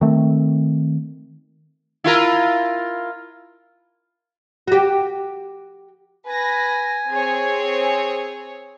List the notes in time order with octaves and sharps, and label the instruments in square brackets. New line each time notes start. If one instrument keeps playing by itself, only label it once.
[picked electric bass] D#3 A3 C4
[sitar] E4 F4 A#4
[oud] F#4 G4
[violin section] B4 A#6 [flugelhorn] G#5
[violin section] C4 G#4 C#5